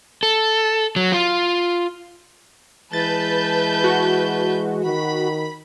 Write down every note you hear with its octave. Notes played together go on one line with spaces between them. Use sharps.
A4
F#3
F4
E3 G#3 B4 A5 G6 A6
F#4
D#3 B5